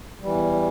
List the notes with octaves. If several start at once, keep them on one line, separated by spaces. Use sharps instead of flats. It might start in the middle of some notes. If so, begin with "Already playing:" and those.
E2 E3 G3